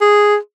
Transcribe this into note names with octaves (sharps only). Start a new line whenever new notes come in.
G#4